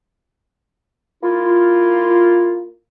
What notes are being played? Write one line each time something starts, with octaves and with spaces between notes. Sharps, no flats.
A#3 E4 F4